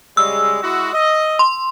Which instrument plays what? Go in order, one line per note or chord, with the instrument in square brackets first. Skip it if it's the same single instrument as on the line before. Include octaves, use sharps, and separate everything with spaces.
[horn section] C#3 G3 G#3 [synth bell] E6
[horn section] G#3 E4 F#4
D#5
[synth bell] C6